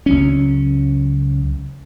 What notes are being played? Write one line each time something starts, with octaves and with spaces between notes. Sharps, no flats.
C#2 F#3 C#4